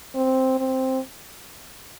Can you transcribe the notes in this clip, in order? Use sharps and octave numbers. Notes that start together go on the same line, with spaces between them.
C4
C4